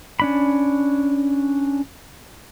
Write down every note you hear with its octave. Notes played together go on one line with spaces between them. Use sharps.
C#4 D4 B5